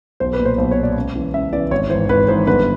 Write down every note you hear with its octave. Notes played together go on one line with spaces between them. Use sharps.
B1 C5
B4
A#2
C5
B1 C5
C#5
A#2
D5
C#2
C#3 E3
C#2 E5
C#3 E3 D5
G#1 C#5
G#2 E3 C5
G#1 B4
G#2 E3 C5
G1 B4